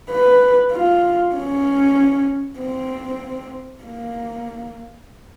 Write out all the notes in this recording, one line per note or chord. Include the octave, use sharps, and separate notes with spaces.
B4
F4
C#4
C4
A#3